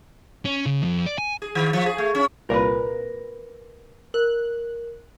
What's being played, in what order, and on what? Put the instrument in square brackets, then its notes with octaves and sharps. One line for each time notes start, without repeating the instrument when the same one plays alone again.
[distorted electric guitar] C#4
C#3
F2
D5
G#5
[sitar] G#4
D#3
F3
G#4
A3
C#4
[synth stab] C2 A#2 [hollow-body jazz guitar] A#4 B4
[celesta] A#4 [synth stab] F#6